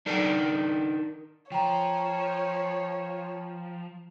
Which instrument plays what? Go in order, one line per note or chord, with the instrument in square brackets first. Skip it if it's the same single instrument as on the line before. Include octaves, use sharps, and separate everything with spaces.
[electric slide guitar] D4 D#4 A#4 D5 G5
[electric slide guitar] F3 [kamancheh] C#5 [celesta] G5 A#5